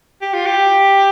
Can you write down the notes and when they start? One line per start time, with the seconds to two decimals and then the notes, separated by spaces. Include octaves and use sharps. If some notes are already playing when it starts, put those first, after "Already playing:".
0.22 G4
0.33 F4
0.46 G4